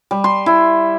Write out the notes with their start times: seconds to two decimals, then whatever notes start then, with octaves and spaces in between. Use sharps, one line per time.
0.11 G3
0.24 C6
0.46 E4